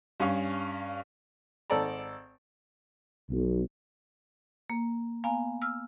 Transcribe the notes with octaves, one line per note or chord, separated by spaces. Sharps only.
G2 C#4 F5 C#6
G#1 A4 D5 A5 A#5
B1
A#3
B3 F5 G#5 A#5
E6 F6